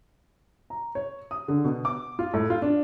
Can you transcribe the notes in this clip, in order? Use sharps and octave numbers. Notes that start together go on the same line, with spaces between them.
A#5
C#5
D#6
D3
B2
D6
F4
A2
F4
D4